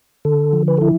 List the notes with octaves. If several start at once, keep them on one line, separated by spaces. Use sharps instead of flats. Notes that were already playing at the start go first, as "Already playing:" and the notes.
D3 A4
F3
B4
E4 A4